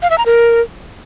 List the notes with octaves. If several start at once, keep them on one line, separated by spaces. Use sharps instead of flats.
F5
E5
A#5
A#4